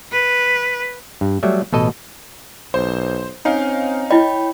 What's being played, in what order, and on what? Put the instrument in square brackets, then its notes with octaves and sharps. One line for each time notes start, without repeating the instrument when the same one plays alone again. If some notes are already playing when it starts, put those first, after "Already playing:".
[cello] B4
[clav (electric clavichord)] G2
F#3 G3 A3 E5
A1 B2 A4 D#5
[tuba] B1 [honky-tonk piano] C5
[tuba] C4 [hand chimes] C#4 C#5 G#5 [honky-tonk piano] D#4 F5
[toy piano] E4 D#5 [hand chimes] C#5 G5 B5